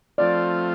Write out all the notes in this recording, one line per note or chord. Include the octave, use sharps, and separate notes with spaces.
F3 A3 C4 F4 D5